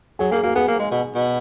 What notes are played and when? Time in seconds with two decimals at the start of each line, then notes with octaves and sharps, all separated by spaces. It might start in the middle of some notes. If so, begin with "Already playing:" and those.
0.19 F#3 G#4
0.31 A#3 G#4
0.43 A#3 F#4
0.55 B3 G#4
0.68 A#3
0.79 G#3
0.91 B2
1.15 B2